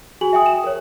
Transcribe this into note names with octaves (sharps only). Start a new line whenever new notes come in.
F#4 G#4 G#5 F#7
E5 G5 G#5 D#6
E7
A#4 C#5